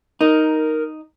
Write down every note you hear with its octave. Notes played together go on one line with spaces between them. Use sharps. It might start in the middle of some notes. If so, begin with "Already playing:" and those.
D#4 A#4